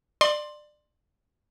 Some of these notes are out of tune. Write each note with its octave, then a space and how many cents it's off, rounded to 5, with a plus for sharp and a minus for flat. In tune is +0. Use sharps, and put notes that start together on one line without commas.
D5 +25 C6 +5